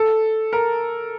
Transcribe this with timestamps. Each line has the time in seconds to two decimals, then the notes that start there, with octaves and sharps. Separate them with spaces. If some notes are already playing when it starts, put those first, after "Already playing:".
Already playing: A4
0.53 A#4